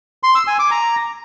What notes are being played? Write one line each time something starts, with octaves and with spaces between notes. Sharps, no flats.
C6
E6
G#5
D6
A#5